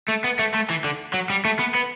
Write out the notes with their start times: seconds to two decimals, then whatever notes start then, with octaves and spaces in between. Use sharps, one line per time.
0.09 A3
0.24 B3
0.39 A3
0.54 A3
0.70 E3
0.84 D3
1.14 F#3
1.30 G3
1.45 A3
1.59 B3
1.75 B3